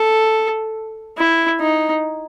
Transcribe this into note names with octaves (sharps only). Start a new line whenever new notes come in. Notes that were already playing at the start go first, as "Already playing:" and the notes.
Already playing: A4
E4
D#4